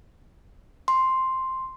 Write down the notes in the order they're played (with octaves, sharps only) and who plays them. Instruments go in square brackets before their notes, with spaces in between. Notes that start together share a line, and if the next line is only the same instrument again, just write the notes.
[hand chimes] C6